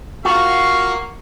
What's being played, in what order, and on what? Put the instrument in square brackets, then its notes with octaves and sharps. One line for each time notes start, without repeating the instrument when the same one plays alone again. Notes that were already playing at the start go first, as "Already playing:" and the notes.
[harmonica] A#3 F5 [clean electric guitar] F4 F#4 [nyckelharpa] C#6